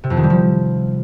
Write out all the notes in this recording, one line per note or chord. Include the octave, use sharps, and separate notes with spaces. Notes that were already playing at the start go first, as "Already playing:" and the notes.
C3
F2
D#3
G3
F3